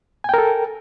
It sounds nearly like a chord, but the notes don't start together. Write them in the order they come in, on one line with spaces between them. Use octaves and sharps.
G#5 G5 A#4 A4